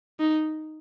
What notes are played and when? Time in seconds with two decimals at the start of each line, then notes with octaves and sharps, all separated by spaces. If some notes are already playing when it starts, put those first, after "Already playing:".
0.20 D#4